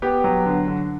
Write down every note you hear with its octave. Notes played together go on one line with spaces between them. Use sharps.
B3 G4
F#3
D3
D3